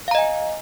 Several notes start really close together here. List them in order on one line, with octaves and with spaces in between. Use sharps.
F5 A#5 D#5 G#5